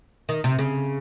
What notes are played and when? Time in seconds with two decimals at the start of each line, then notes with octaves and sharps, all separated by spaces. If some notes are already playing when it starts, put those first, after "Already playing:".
0.29 D#3
0.44 C3
0.59 C#3